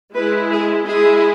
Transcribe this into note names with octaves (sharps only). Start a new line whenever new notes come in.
G#3 E4 B4
G#4
G#3 E4 G#4